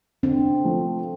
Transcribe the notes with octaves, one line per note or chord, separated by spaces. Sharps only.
D3 C4
F3 A3